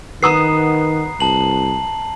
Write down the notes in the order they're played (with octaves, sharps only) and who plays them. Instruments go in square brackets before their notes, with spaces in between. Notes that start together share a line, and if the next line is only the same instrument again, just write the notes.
[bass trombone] D#3 [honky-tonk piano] B4 F#5 D#6 [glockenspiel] A#5 C7
[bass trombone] C2 [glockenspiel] A5 F#7